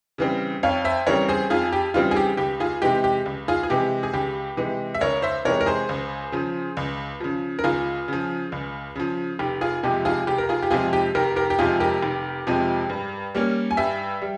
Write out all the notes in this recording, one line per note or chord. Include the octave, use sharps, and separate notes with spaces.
C#3 E3 G3 C4
F2 C#5 F5
C5 E5
C#3 E3 G3 C4 A#4 C#5
G#4 C5
F2 F4 G#4
G4
C#3 E3 G3 C4 F4
G#4
G4
C#2 G4
F4 G#4
C3 E3 G#3 G4
G4
C#2
F4 G#4
G#4
C3 E3 G#3 G4
G#4
C#2 G4
C3 E3 G#3
E5
C#2 A#4 C#5
C5 E5
C3 E3 G#3 A#4 C#5
A#4
G#4 C5
C#2
C#3 F3
C#2
C#3 F3
A#4
C#2 F4 G#4
C#3 F3
C#2
C#3 F3
F1 G4
F4 G#4
F2 C3 F3 G#3 G4
F4 G#4
F1 G4
A#4
F4 G#4
G4
F2 C3 F3 G#3 F4 G#4
G4
F1 G4 A#4
G4 A#4
G4
F2 C3 F3 G#3 F4 G#4
G4 A#4
F1
F2 C3 F3 G#3
G2
G3 A#3 C#4
G#5
G2 E5 G5
G3